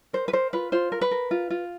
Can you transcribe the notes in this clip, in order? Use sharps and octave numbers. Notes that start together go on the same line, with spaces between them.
A#4 C5
B4
A#4 C5
F4 B4
F4 C5
A#4
B4
A#4
F4
F4